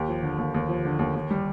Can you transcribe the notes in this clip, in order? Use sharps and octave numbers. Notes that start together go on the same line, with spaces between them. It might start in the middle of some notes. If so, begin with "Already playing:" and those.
Already playing: D#2 G4
F3
D3
D#2
D#2
F3
D3
D#2
D#2
G3